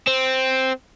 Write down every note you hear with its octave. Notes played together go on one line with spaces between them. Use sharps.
C4